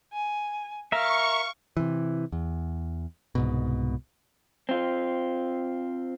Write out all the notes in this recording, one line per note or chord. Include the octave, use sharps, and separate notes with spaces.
G#5
A#4 E5 F5 C#6
C3 E3
E2
C2 G#2 B2
C4 F4